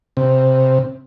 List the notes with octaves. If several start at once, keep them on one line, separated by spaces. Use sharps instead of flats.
C3